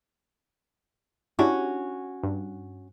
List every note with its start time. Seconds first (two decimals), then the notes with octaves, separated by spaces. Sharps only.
1.39 C#4 D4 E4 F#4 G4
2.23 G2